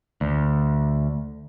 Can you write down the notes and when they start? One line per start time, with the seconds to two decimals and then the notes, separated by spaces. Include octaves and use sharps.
0.21 D2